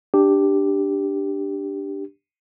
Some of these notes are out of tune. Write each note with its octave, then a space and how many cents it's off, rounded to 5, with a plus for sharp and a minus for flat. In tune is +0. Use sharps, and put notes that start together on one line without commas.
D4 +0 G4 +0